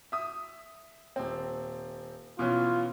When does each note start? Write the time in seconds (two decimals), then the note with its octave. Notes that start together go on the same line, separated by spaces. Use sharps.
0.12 E5 D#6
1.16 D#1 C4
2.39 B2 E3 C#4 F4